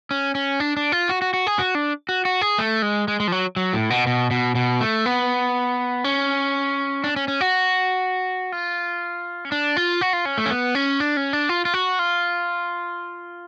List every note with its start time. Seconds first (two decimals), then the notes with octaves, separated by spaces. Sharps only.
0.11 C#4
0.35 C#4
0.60 D4
0.77 D4
0.92 F4
1.09 F#4
1.22 F#4
1.34 F#4
1.47 G#4
1.59 F#4
1.75 D4
2.09 F#4
2.25 F#4
2.41 G#4
2.58 A3
2.82 G#3
3.08 G#3
3.20 G#3
3.28 F3
3.32 F#3
3.56 F#3
3.73 A2
3.90 B2
4.07 B2
4.31 B2
4.55 B2
4.81 A3
5.06 B3
6.04 C#4
7.04 D4
7.16 C#4
7.28 C#4
7.41 F#4
8.52 F4
9.45 C#4
9.52 D4
9.77 F4
10.01 F#4
10.13 F4
10.25 C#4
10.38 A3
10.46 C#4
10.50 B3
10.75 C#4
11.00 D4
11.17 C#4
11.33 D4
11.49 F4
11.65 F4
11.74 F#4
11.99 F4